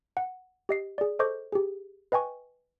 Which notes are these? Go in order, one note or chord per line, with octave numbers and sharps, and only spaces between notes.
F#5
G4 D#5 C7
G#4 D5
A4 C5 D#5 C#6 D6 G6
G4 G#4
B4 D#5 G5 G#5 C#6